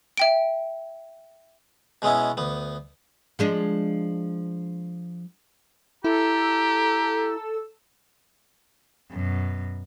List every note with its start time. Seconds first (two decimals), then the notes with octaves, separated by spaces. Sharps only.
0.17 E5 G5 D7
2.02 B2 G#3 B3 C#4 E4
2.37 D2 B3
3.39 F3 G#3 D4
6.05 E4 G4 A4 A#5 E6
9.11 F#2 B2